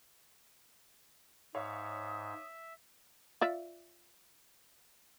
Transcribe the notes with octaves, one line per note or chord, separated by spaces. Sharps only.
G#2 C#5 E5 F5 D#6
F4 D5 E5